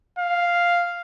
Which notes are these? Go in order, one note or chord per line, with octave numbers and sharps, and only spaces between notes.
F5